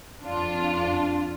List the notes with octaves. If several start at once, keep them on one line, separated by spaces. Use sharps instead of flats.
F2 D4 F4